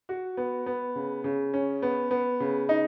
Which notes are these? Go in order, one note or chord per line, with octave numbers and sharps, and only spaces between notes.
F#4
B3
B3
C#3
C#3
C#4
B3
B3
C#3
D#4